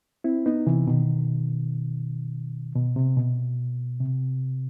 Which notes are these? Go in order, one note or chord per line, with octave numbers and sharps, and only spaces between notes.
C4 E4
B3 D#4
C3 E3
B2 D#3
B2
C3
B2
C3